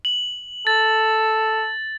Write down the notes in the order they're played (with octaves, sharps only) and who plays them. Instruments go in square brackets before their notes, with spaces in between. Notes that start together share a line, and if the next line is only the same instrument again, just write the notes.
[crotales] F#7
[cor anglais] A4 [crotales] A6